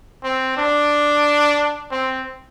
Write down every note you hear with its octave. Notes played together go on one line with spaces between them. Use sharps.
C4
D4
C4